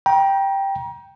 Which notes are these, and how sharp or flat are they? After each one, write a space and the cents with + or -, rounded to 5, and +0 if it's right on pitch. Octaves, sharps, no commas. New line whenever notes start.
G5 +0 A#5 +35